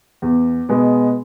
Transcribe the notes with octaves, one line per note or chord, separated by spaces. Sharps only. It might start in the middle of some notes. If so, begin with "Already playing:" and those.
E2
B2 G#3 B3